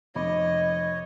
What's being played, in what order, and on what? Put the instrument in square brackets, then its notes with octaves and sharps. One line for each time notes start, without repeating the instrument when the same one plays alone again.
[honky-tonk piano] F1 B5 D6 [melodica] C#5 [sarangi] D#5